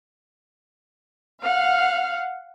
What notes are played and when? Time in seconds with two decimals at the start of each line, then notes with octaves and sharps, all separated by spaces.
1.43 F5 F#5 F6